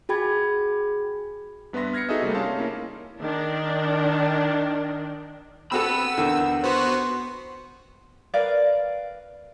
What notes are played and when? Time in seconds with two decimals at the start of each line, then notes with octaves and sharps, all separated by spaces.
0.09 F#4 G#4 G5 B5 G#6
1.73 G2 B3 B4 E5 C6 A#6
1.93 F6 G#6 A#6 C7 C#7
2.09 D#4 F#4 G#4 A4 D#5 E5
2.22 C3 G3 A3 A#3
2.34 C#4 D#4 F5 A5 C6
2.58 A#3 C#4 E4
3.21 D#3 D4
5.72 C4 F#4 A4 F#5 B5 E6
6.17 E2 D3 D#3
6.64 B3 F#4 C5
8.34 A#4 B4 D5 F5